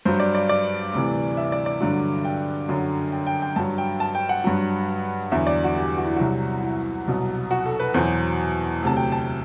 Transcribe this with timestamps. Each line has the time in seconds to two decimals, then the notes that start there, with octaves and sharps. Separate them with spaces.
0.05 G2 F#3 C5
0.20 D5
0.35 D5
0.49 D5
0.93 D2 C3 E3
1.37 E5
1.52 D5
1.66 D5
1.81 G2 D3 F#3
2.25 G5
2.69 F#2 D3 F#3
3.12 G5
3.27 G5
3.42 G5
3.56 G2 F#3 A5
3.78 G5
4.00 A5
4.15 G5
4.29 F#5
4.44 G2 F#3
5.32 E2 D3 F#3 E5
5.47 D5
5.64 F#4
5.76 G4
5.98 F#4
6.07 E4
6.16 C2 C3 F#3 F#4
6.63 E4
7.07 C2 B2 F#3
7.51 F#4
7.66 A4
7.80 B4
7.94 E2 B2 F#3 C5
8.83 D2 C3 F#3 A5
8.97 G5
9.12 A5